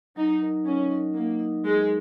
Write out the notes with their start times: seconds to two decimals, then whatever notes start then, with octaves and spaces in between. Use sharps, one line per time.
0.16 F#3 D#4
0.40 D#4 A#4 D#5
0.66 F#3 C#4
0.90 D#4 A#4 D#5
1.14 F#3 A#3
1.39 D#4 A#4 D#5
1.64 F#3 G#3